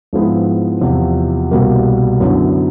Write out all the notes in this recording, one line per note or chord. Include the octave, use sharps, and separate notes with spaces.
G#2 F3 G#3 B3 E4
E2 C3 F3
C2 B2 G3 A#3
F#2 D3 F#3 B3 E4